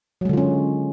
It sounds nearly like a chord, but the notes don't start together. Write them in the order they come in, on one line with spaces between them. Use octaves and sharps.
F#3 G#3 D3 F4 C#4